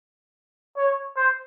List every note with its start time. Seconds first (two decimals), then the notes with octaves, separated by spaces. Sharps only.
0.77 C#5
1.16 C5